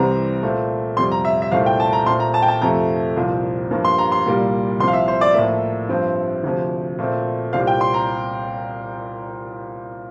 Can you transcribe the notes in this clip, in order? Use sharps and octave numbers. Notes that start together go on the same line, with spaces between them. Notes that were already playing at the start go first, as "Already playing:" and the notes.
Already playing: C2 C3 E3 G3 C4 A#5
A#2 A3 C4
F2 C3 G3 C6
A#5
E5
E5
C2 A#2 A3 C4 F5
G5
A5
A#5
A#2 A3 C4 C6
A#5
A5
G5
A5
F2 C3 F3 A3 A#5
C2 A#2 F3 C4
G2 F3 A#3
C6
A#5
C6
C2 A#2 G3 A#3
C2 C3 F3 C6
F5
E5
C5
D5
A2 F3 A#3 E5
G2 F3 C4
D2 C3 F3
A#2 A3 C4
C2 A#2 G3 C4 F5
G5
C6
A#5